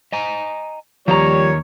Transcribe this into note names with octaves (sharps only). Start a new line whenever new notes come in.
D#5 G#5 A#5
D#2 D#3 F3 G3 A#4 C#5 A#5